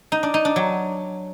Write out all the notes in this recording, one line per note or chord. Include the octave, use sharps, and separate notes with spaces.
D#4
D4
D#4
D4
F#3